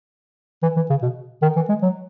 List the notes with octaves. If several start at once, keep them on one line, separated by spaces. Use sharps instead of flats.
E3
E3
C#3
B2
D#3
E3
G#3
F#3